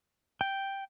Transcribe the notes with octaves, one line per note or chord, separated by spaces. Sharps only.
G5